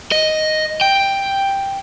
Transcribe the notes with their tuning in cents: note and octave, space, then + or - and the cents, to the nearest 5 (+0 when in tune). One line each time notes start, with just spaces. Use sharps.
D#5 +0
G5 +5